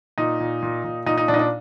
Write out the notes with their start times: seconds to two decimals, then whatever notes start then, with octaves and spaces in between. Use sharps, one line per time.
0.18 A#2 D#4
0.40 A#2
0.62 A#2
0.84 A#2
1.06 A#2 D#4
1.18 D#4
1.28 A#2 D4
1.34 D#4
1.39 D4